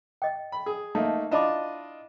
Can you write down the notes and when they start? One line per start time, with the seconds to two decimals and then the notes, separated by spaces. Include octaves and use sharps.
0.22 D#5 G5
0.52 B5
0.66 G#4
0.95 A3 A#3 D#4 E5 A5
1.31 D4 E4 F4 D#5 B5 D6